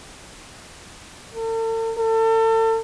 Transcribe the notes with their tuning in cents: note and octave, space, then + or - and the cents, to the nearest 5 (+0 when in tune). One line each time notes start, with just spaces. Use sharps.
A4 +45
A4 +35